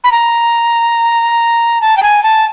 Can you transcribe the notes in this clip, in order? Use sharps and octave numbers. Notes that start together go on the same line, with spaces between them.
B5
A#5
A5
G5
G#5
A5